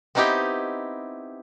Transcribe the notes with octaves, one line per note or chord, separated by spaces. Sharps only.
B3 C4 D#4 E4 G4 G5